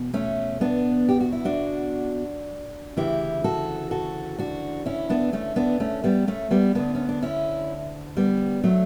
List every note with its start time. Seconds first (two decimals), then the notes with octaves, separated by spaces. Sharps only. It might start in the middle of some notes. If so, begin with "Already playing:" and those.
Already playing: E2 B2
0.14 A3 C#4
0.61 B3 D4
1.08 G4
1.21 F#4
1.32 E4
1.45 D4 F#4
2.97 D2 C#3 E3 E4 G4
3.44 F#4 A4
3.91 F#4 A4
4.38 D4 F#4
4.86 C#4 E4
5.10 B3 D4
5.33 A3 C#4
5.56 B3 D4
5.80 A3 C#4
6.04 G3 B3
6.27 A3 C#4
6.51 G3 B3
6.75 D2 D3 B3 D4
6.95 C#4
7.09 D4
7.22 C#4 E4
8.17 G3 B3
8.64 F#3 A3